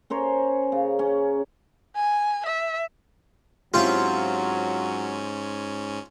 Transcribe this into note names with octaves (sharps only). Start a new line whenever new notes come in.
C#4 A#4 C5 C#5
C#3
C#4
G#5
E5
G#2 F#3 C4 C#4 E4 F4 G4